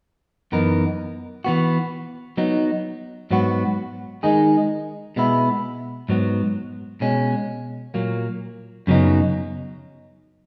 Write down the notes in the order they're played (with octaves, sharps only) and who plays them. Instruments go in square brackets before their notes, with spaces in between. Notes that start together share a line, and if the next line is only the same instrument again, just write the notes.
[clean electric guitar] F#2 E3 B3 D#4 A#4
E3 B3 F#4
F#3 B3 D#4
G#2 F#3 B3 F#4
D#3 G#3 D#4 G#4
B2 G#3 B3 E4
G#2 F#3 B3
B2 G#3 C#4
A#2 F#3 A#3
F#2 C#3 F#3 B3 D#4